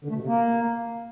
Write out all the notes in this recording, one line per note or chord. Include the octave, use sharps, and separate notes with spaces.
D3
A3
B2
C3
A#3